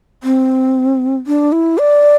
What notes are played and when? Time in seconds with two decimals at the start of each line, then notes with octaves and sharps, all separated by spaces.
0.23 C4
1.27 D4
1.52 E4
1.78 D5